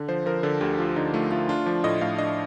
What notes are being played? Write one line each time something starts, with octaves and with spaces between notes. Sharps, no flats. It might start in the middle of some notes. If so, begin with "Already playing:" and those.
Already playing: D3
F3 C5
F3 A#4
D3 A4
D2 G4
F3 F4
D3 D#4
A3 F4
A3 F4
D4 F4
F3 D5
A2 D#5
A2 F5
D4 D#5